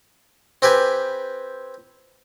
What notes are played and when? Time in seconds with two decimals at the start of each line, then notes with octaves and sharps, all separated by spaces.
0.62 C4 G4 B4 G#5